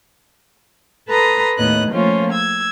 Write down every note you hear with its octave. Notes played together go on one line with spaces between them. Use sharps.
A4 B4 A#5 C6 D#6
D#2 A2 B3 D#5 F#6
F3 A3 A#3 C#4 F4
E6 G#6